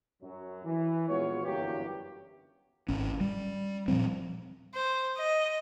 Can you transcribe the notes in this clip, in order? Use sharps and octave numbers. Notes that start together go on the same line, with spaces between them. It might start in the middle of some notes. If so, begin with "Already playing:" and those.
F#2 F#3
E3
A#1 G#3 B3 F4 F#4 C#5
G1 F#2 E3 F#3 A#3 G4
G#1 C#4
G3
A#2 F3 G3 C4
C5
D#5